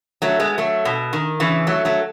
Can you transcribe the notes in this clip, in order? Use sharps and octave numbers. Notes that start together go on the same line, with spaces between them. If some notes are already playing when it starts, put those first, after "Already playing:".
F#3 A3
G#3 B3
F#3 A3
B2
D#3
C#3 E3
F#3 A3
F#3 A3